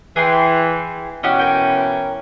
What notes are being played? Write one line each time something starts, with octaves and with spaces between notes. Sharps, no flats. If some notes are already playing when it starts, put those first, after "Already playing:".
E3 G#4 G5 C6
B2 E3 C#4 F#4 G4 D#5
A#4 G5